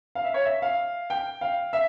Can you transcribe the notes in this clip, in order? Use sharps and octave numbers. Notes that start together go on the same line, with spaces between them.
F5
E5
C#5
E5
F5
G5
F5
E5